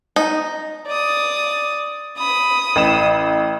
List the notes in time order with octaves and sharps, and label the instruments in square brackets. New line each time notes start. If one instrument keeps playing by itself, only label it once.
[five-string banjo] D#4
[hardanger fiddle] D5 D#6
B5 D#6
[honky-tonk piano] A1 E7